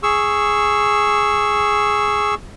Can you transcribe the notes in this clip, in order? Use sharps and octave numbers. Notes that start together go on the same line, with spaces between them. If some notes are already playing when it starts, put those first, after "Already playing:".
G#4 C#6 E6